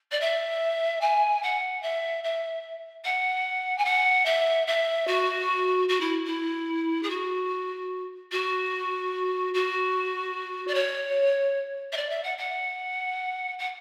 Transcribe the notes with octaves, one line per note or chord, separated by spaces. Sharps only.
D5
E5
G#5
F#5
E5
E5
F#5
G#5
F#5
E5
E5
F#4
F#4
E4
E4
G#4
F#4
F#4
F#4
D5
C#5
E5
D5
E5
F#5
F#5
F#5